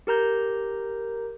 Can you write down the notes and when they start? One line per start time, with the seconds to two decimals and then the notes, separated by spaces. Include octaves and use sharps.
0.07 G4 A#4 A#5 G6